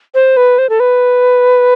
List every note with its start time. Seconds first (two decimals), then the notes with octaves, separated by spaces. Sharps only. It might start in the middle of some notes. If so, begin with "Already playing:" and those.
0.15 C5
0.37 B4
0.58 C5
0.69 A4
0.80 B4